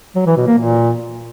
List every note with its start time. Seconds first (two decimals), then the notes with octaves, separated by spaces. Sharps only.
0.15 F#3
0.26 E3
0.37 B2
0.47 A#3
0.58 A#2